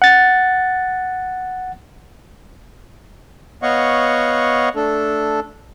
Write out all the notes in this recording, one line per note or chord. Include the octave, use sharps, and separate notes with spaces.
F#5 A6
B3 C#5 D#5 F5 F#5 C#6
A3 D4 A4